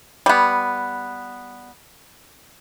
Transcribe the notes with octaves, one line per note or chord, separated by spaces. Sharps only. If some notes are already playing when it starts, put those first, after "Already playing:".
G3 B3